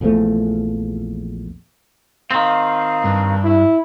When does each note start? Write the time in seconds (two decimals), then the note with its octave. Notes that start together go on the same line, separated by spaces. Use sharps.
0.01 A#1 E2 F3 A3
2.31 D#3 C4 F5
3.04 G2
3.44 E4